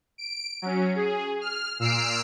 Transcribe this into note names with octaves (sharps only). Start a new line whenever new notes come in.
D7
F#3 C#4
G#4
F6
A#2 E6 F6 C7 D7